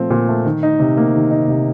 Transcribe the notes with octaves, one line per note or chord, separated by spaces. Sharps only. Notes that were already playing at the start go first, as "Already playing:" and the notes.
Already playing: A#2 F3 A3 C4
A#2
A3
D#3
D#4
C3
A#3
D#3
D#4
C3